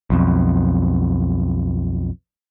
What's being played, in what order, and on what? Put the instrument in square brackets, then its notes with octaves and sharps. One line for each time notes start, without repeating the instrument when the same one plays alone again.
[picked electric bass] B1 F2